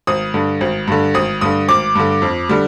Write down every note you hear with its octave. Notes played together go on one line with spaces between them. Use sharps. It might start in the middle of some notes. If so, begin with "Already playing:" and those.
G#1 D#6
G2 D3
G#1
G2 D3
G#1 D#6
G2 D3 D#6
G#1 D6
G2 D3
F2
D3 G3